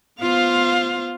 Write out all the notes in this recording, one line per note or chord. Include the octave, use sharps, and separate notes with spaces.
B3 F4 C5 F5